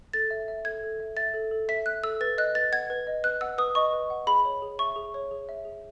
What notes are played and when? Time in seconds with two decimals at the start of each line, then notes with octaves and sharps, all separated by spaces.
0.13 A4 A6
0.31 E5
0.48 E5
0.65 A4 G#6
0.83 A4
1.00 E5
1.17 E5 A6
1.34 A4
1.51 A4
1.69 E5 B6
1.86 E5 F#6
2.03 A4 E6
2.21 B4 A6
2.38 D#5 F#6
2.55 B4 A6
2.72 F#5 G#6
2.90 B4
3.07 D#5
3.24 B4 F#6
3.41 F#5 E6
3.58 B4 D#6
3.75 D#5 C#6
3.93 B4
4.10 F#5
4.27 G#4 B5
4.45 C#5
4.62 G#4
4.79 E5 C#6
4.96 G#4
5.14 C#5
5.31 G#4
5.49 E5
5.65 G#4